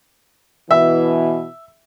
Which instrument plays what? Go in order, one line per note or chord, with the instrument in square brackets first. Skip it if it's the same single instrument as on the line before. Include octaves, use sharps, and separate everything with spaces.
[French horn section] B2 E3 [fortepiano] E5